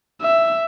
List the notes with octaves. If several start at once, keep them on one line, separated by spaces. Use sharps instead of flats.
E5